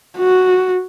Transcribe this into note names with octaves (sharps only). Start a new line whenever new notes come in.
F#4